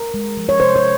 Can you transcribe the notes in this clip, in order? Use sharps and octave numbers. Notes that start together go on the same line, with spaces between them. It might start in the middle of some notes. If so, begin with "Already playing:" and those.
Already playing: A#4
G#3
F3
C#5
C3 C5
C#5